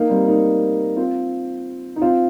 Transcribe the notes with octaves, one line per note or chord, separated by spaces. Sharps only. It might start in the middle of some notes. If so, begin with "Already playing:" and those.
Already playing: A#3 D#4
G3 C4
A#3 D#4
C4 F4
D#4
C4 F4